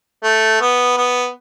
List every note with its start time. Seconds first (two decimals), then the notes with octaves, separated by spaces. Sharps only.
0.23 A3
0.61 B3
0.97 B3